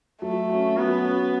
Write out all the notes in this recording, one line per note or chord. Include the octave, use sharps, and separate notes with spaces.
F#3 A3
C#4 F#4
F#3 B3
C#4
F#4